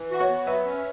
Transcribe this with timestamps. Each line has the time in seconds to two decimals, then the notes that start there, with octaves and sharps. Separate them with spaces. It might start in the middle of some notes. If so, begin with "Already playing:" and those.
Already playing: E3
0.11 F#4
0.20 C#5 F#5
0.29 B3
0.47 F#3 B4 E5
0.65 C#4